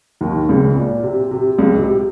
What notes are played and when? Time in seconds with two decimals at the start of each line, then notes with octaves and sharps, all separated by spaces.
0.21 D#2 D#3
0.49 C#2 C#3
0.76 A#2
1.03 C3
1.31 C3
1.58 C#2 C#3
1.79 C3